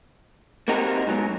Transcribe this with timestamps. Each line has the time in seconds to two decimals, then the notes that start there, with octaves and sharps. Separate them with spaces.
0.68 A#3 C4 D#4 F#4 G4 A#4
1.07 G#2 B2 F#3